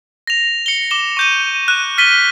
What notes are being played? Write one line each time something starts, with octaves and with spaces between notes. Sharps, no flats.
A#6 F7
C#7 G7
D6 E7 G7
C#6 G6 D#7
F#6 E7
F6 A6 B6 D#7 G7